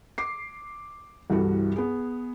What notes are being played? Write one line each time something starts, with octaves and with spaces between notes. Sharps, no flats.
D6 C7
C2 G2 E3 F#4 A4
B3 G#4